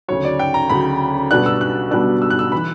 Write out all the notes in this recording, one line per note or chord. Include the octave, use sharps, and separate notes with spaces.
D2 C#3 F#3 C#5
D5
G5
A#5
D2 C#3 F#3 B5
B1 B2 G3 B3 D4 F#6
E6
F#6
B1 B2 G3 B3 D4 F#6
E6
F#6
E6
E3 B5